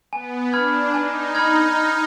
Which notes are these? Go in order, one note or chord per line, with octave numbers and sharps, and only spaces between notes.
B3 G#5
D4 B5 F6 G#6
D#4 G#5
B5 F6 G#6
F6